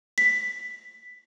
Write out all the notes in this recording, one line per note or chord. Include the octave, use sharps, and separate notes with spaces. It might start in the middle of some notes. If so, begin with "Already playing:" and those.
B6